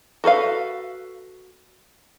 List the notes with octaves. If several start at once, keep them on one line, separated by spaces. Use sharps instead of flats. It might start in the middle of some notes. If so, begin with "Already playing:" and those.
F#4 A4 B4 F5